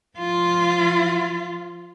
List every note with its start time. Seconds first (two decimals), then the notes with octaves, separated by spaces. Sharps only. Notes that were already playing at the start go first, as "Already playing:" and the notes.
0.17 F3 F4